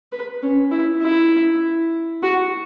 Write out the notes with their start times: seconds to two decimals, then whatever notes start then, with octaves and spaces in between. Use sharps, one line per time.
0.12 B4
0.43 C#4
0.72 E4
1.02 E4
2.23 F#4